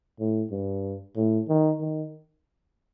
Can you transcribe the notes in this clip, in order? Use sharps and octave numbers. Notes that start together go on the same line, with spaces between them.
A2
G2
A2
D#3
D#3